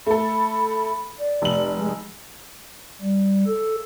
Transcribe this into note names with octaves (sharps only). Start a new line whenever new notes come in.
A3 A4 B5
D5
F1 F#7
G#3
G3
A4